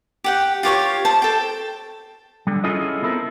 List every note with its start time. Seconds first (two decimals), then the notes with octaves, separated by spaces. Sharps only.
0.24 G4 F#5 G5
0.63 F4 G4 C#5 C#6
1.05 C5 A5
1.22 A4 G5
2.47 D3 G3
2.64 C#4 E4 F4 G#4 A4 D#5
3.02 B3 C4 E4 A4 A#4